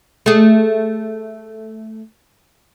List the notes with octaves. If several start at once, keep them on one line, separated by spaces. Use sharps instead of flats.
A3 G#4